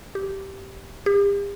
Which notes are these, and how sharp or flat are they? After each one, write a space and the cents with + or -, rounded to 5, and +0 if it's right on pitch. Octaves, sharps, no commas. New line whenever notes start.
G4 -10
G4 +40